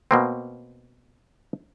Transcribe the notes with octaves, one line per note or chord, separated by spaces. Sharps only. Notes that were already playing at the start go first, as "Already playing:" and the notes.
B2 A#3 C4